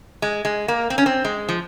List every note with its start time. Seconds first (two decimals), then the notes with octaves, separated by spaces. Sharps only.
0.22 G#3
0.45 G#3
0.68 A#3
0.90 C4
0.98 C#4
1.06 C4
1.24 G#3
1.49 F3